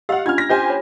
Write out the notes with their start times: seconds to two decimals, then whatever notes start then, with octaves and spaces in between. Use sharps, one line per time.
0.09 G4 D#5 F5 F#5 E6
0.26 C#4 D4 F4 F6 G#6
0.38 A#6
0.49 G4 C5 G#5
0.67 C#5 B5